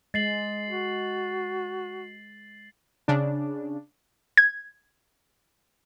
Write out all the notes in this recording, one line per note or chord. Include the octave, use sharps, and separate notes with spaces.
G#3 A6 C7 F#7
F#4
C#3 D4
G#6